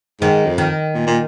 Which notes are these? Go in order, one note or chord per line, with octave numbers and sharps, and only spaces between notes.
G#2 D#3
F2
D#3
A#2
A#2